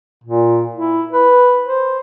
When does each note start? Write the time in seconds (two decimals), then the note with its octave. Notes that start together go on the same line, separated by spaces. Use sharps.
0.24 A#2
0.75 E4
1.12 B4
1.65 C5